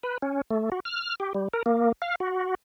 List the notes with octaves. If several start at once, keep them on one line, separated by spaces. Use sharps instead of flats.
B4
C#4
A3
F#4
F6
G4
G3
A#4
A#3
F5
F#4